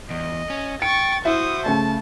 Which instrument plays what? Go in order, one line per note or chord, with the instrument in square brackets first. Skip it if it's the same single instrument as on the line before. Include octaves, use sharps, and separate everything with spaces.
[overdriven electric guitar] E2 [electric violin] D#5
[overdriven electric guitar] C#4
[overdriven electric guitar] G5 [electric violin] C#6 A6 [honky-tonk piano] C#7
[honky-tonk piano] E4 E5 [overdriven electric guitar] F#4 [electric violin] C5 D#6
[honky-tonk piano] C#3 A3 [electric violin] A5